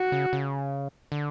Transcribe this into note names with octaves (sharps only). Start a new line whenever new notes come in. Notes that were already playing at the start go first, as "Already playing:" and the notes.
Already playing: F#4
C#3
C#3
D3